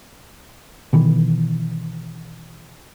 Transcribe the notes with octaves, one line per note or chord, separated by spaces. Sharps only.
B2 D#3 E3